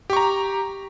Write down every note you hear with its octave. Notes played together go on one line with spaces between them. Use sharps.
G4 A#5 C#6